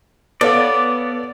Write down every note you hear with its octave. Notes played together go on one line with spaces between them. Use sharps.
B3 A4 C#5 D5 F5